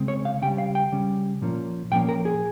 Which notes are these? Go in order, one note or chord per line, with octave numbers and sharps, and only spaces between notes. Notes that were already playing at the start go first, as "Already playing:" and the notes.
Already playing: C#3 G#3 C4
C#5
F5
C#3 G3 C#4 G5
F5
G5
C#3 G3 C#4
A#2 F3 A#3 C#4
A#2 F3 A#3 C#4 G5
A#4
G#4